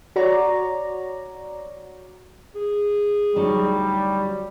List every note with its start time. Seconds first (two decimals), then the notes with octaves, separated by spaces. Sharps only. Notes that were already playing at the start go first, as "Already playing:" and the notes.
0.16 F#4 C#5 D5 A#5
2.55 G#4
3.36 D2 F#3 G3 D#4